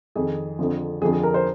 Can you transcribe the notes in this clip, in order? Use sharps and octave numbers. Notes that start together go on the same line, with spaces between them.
F2 D#3 G#4
F2 D3 F3
F2 D3 F3 G#4
G#4
A#4
C5